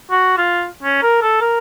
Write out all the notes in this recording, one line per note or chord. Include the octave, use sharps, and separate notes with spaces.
F#4
F4
C#4
A#4
A4
A#4